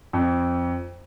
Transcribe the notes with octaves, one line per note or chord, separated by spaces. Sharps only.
F2